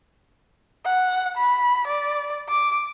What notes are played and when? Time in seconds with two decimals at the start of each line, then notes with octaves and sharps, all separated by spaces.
0.86 F#5
1.37 B5
1.87 D5
2.49 D6